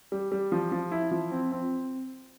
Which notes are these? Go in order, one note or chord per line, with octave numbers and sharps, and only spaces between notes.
G3
G3
F3
F3
E4
F3
C4
C4